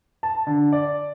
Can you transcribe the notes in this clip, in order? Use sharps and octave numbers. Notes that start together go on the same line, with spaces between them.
A5
D3
D5